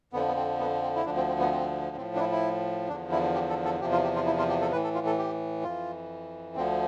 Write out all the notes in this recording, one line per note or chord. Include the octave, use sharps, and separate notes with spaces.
F2 D3 F3 B3
B3
C4
B3
C4
E4
D2 D3 F3 D4
C4
C4
B3
C4
A2 F3 C4
D4
E4
E4
E2 D3 F3 D4
E4
G4
A4
A4
E2 C3 F3 G4
F4
G4
F4
E4
F4
G4
A4
A2 E3 B4
A4
F4
A4
G4
F2 E3 F4
D2 D3 F3 C4